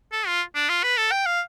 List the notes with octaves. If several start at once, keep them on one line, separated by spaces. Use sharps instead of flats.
A4
F4
D4
F4
B4
A4
G5
F5